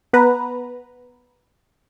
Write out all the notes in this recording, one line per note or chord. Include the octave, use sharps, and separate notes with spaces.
B3 B4 A#5